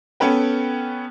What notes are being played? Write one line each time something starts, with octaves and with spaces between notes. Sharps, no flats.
B3 C#4 A4 B4 G5